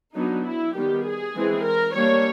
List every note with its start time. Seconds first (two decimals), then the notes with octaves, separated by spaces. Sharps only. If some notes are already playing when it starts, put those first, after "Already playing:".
0.15 F#3 B3 D4 D#4
0.45 E4
0.75 D#3 G3 B3 G4
1.05 G#4
1.36 E3 G#3 C4
1.65 A#4
1.96 G3 A#3 D4 C#5